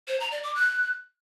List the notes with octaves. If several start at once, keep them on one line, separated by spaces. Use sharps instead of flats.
C5
A#5
D5
D6
F#6